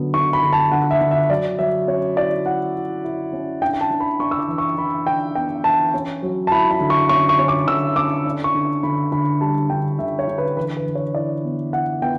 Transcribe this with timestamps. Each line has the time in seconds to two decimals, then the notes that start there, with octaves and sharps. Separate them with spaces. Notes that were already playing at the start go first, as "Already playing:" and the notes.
Already playing: D3 F#3 B3
0.14 D3 C#6
0.33 B5
0.43 D3
0.53 A5
0.72 D3 F#5
0.91 E5
1.01 D3
1.11 E5
1.29 F#3 D5
1.59 F#3 E5
1.88 C#4 C#5
2.17 E4 D5
2.45 E4 F#5
2.75 E4
3.04 E4
3.33 C#4
3.62 D4 G5
3.73 G5
3.81 A5
3.90 D4
4.00 B5
4.20 D4 C#6
4.31 E6
4.39 D6
4.48 E3
4.58 C#6
4.78 E3 B5
5.07 D4 G5
5.35 B3 G5
5.64 E3 A5
5.94 C#4
6.23 F#3
6.47 A5
6.51 E4 B5
6.71 B5
6.80 D3
6.90 C#6
7.09 C#4 C#6
7.29 C#6
7.39 C#4
7.48 D6
7.67 D3 E6
7.96 C#4 D6
8.25 D4
8.44 C#6
8.54 D3
8.83 D3 B5
9.12 D3 B5
9.41 G3 A5
9.70 D3 G5
9.99 D3 E5
10.19 C#5
10.28 D3
10.38 B4
10.57 E3 B4
10.77 B4
10.86 E3
10.95 C#5
11.14 E4 D5
11.45 B3
11.73 E4 F#5
12.02 B3 G5